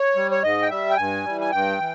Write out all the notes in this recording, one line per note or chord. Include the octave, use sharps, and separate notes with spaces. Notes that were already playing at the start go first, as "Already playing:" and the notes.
Already playing: C#5
G3
C#5
G#2 D#5
G5
G3 E5
G5
G2 G#5
E3 G3
G#5
G2 G5
E3